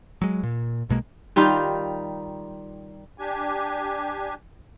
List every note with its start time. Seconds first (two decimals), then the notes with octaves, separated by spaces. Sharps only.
0.22 F#3 G#3
0.43 A#2
0.89 B1 B2 G#3 A#3
1.36 D#3 G3 D#4 F4
3.18 D4 G4 G#5